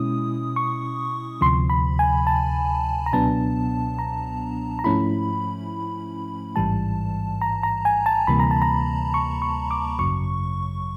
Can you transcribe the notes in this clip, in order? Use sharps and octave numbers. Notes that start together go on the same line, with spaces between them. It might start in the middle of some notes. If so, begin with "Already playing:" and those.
Already playing: B2 G#3 C#4 E4 D#6
C#6
D2 C3 F3 C6
B5
G#5
A5
A#5
C#2 B2 F#3 B3 D4 A5
A#5
A#5
G#2 F3 A3 C#4 E4 B5
A1 G#2 E3 G3 A5
A#5
A#5
G#5
A5
D2 C3 E3 G3 A#3 B5
A#5
A5
A#5
C#6
C#6
D6
G#1 F#2 C#3 F#3 C#6